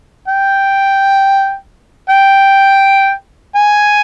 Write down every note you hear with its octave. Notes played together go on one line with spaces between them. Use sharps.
G5
G5
G#5